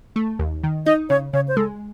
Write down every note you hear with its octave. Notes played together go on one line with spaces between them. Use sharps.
A3
D#2
D#3
D#4 D#5
C#3 C#5
C#3 C#5
C5
G#3 A4